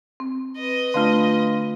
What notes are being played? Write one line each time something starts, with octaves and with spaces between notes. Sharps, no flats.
C4
B4 D#5
D3 A3 D4 F4 F5 C6